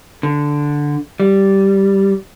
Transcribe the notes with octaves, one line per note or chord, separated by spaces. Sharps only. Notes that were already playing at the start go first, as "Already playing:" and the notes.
D3
G3